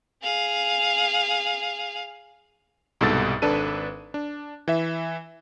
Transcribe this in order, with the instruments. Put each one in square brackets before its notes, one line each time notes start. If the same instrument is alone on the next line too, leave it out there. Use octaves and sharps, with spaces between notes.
[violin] G#4 F5
[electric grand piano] C2 G#2 B2 A4 E6 A6
G#1 D4 A4 B4 D#7
D4
E3 E5